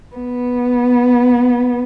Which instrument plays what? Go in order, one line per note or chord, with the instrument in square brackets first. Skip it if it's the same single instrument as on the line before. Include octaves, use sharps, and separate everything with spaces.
[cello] B3